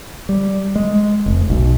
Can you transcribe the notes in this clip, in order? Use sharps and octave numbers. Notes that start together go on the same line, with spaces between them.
G3
G#3
F1
B1